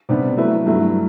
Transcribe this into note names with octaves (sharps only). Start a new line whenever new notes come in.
C3 G3 B3 D4
F#3 A3 E4 B4
G2 F#3 A3 E4